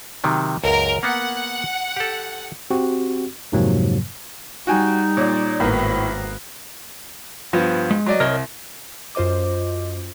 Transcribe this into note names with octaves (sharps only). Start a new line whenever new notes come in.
C3 D#3 F#3
C#2 F#2 A#4
A#3 B3 F#5
G4 A4
C4 F#4 G4
F2 G#2 C3 F3 F#3 A#3
G3 D#4 F#4 G5 G#5
A#2 C#5 D5
G#1 A2 A#3 B3
G2 F3 B3
G#3
F#3 D5 D#5
C2 A#4 C#5 D#5
F#2 F4 C5 D#5 D6